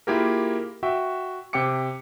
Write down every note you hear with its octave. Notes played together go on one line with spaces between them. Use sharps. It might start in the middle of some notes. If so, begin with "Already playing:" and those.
A#3 E4 F4 G4 G#4 A#4
F#4 E5 G5
C3 G4 G5 D6 C#7